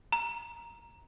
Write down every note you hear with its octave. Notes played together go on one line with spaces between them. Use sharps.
A#5